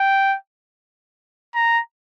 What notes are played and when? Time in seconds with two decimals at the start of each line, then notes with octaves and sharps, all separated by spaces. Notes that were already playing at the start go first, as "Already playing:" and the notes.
Already playing: G5
1.55 A#5